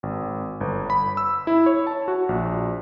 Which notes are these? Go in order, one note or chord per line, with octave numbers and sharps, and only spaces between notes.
G#1
G1
B5
E6
E4
C#5
A5
F#4
A#1